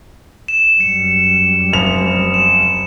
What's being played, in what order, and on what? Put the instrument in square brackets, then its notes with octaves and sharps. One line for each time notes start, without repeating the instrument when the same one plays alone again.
[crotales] E7
[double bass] F#2 G3 [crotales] C#7
[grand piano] F1 F7
[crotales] E7